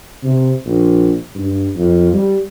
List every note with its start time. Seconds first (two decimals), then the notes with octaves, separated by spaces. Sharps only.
0.23 C3
0.66 A#1
1.35 G2
1.76 F2
2.13 G3